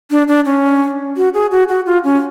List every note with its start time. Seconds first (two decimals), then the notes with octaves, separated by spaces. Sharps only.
0.11 D4
0.28 D4
0.46 C#4
1.17 F#4
1.34 G#4
1.51 F#4
1.69 F#4
1.86 F4
2.04 C#4